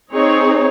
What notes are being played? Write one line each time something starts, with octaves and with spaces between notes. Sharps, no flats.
C4 D#4 G#4 C#5